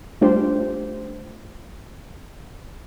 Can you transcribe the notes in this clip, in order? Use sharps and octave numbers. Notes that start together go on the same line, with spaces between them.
G3 A3 D4 F4 G4 C5